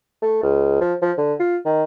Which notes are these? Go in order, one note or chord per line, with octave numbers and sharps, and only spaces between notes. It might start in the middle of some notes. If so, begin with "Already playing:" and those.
A3
C#2
F3
F3
D3
F4
D#3